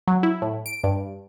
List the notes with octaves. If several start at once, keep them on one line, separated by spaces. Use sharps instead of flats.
F#3
E4
A2
D7
G2